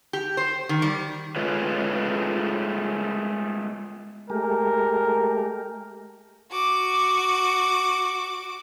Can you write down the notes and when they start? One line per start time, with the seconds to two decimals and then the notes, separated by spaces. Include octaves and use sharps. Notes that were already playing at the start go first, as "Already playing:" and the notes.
0.13 G4
0.37 C5
0.69 D#3
0.82 G3
1.36 G#3 A3 F4 G#4 B4 C#5
4.30 G#3 A3 G4 A#4
6.51 F#4 D6